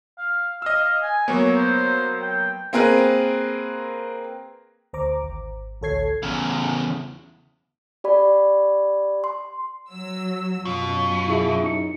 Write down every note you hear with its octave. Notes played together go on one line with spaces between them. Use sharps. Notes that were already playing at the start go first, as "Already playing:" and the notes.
F5
D#5 F5 E6
G#5
F#3 A#3 B3 C#5
C5
G5
A#3 C4 G#4 A#4 B4
D2 C5 A#5 D6
G#1
A1 D2 A4 C#5 G#6 C7
E2 C#3
G4 D5 B5
C6
F#3 E6
F#2 B2 F4
E4 G#4 E5
D#4 C#7